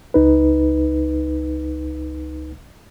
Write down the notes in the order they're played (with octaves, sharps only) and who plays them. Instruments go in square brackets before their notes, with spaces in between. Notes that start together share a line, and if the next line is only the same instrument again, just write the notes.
[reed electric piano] C#2 D#4 B4